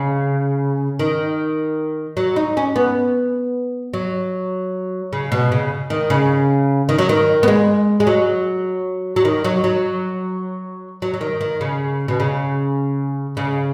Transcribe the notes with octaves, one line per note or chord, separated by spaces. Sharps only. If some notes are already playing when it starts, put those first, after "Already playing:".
Already playing: C#3
D#3
F#3
D#4
C#4
B3
F#3
C#3
B2
C#3
D#3
C#3
D#3
F#3
D#3
B3
G#3
G#3
F#3
F#3
D#3
F#3
F#3
F#3
F#3
D#3
D#3
C#3
B2
C#3
C#3